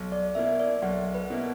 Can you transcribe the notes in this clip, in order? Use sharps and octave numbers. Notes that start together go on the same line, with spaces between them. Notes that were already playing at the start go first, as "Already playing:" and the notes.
Already playing: B1
D5
B2 A#3 E4 E5
D5
B1 F#5
B4
B2 A#3 E4